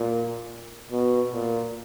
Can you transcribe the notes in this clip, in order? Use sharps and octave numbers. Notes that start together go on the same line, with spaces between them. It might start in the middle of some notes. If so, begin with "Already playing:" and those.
Already playing: A#2
B2
A#2